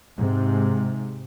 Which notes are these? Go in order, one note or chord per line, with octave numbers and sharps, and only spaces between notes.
G#2 C3